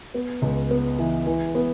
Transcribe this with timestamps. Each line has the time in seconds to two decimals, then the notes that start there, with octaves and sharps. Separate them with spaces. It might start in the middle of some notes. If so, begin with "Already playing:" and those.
0.14 B3
0.42 C#2
0.71 B3
0.99 E3
1.26 E3
1.55 B3